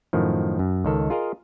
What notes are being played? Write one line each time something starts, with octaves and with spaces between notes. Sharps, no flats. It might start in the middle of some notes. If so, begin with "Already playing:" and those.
F#2 A2 D#3 F3
F#2
C#2 D#3 A4
F4 G#4 A#4 D#5 F5